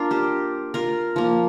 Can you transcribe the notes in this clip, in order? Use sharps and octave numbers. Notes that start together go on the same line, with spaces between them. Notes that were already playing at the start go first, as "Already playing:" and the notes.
Already playing: A#3 D4 F4 A#4
G4 C5
F4 A#4
F3 A#3